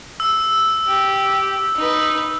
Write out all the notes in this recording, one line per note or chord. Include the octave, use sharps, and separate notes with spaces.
E6
G4
D#4 B4